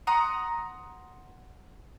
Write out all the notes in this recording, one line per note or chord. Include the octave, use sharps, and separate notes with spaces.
F#5 A#5 C6 D#6